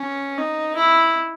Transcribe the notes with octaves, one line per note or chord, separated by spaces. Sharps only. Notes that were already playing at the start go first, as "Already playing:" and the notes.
Already playing: C#4
D#4
E4